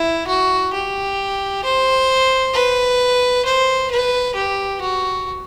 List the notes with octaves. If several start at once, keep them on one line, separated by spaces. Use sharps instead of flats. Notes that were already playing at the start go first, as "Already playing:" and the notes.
Already playing: E4
F#4
G4
C5
B4
C5
B4
G4
F#4